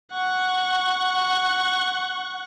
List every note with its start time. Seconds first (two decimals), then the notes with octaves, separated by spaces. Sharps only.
0.12 F#5 C#6